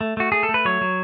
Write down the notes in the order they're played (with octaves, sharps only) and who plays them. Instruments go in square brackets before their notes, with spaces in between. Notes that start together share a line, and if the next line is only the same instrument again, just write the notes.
[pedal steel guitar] A3
A3 F#4
A3 G#4
A4
A3
B4
F#3 C#5
F#3